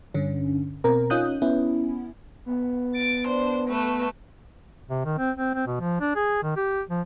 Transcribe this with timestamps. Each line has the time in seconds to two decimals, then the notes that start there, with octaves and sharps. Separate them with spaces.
0.14 G2 D3 C#4
0.84 B2 C4 A#4
1.10 C#4 D#4 F4 D#6 F#6 G6
1.42 B3 C#4 E4
2.46 B3
2.95 A6 D7
3.28 D4 C5
3.68 A3 B4
4.90 C3
5.05 D#3
5.18 C4
5.37 C4
5.55 C4
5.67 B2
5.80 F3
6.01 D4
6.16 G#4
6.43 D#3
6.56 G4
6.90 F3